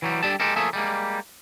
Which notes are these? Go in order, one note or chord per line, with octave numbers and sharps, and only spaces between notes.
E3 F#3 G3
G3 D4 G4 A4 A5
G#3 G4 A4 A#4
F3 A3 A#3 G#4 A4 E5
G3 G#3 A#3